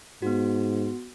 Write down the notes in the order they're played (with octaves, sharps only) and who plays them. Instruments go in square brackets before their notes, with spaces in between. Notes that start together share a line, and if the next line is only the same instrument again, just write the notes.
[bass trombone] G#2 [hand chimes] B3 F#4